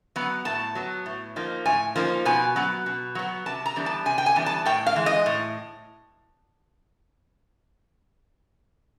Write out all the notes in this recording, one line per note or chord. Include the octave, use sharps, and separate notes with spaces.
F#3 B3
A2 A5
F#3 B3
A2
F3 A#3 D#4
A2 G#5
F3 A#3 D#4
B2 G#5
F#3 B3
B2
F#3 B3
C3 A5
A#5
E3 G3 B3 D4
A5
C3 G#5
G5
G#5
E3 G3 B3 D4
A5
A2 G5
F5
E3 G#3
D#5
A2